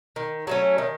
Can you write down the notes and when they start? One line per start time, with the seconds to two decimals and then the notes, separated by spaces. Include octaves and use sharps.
0.16 D#3
0.47 F#3 A3 C#4
0.78 D#3